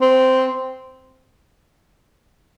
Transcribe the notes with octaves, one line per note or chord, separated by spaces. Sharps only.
C4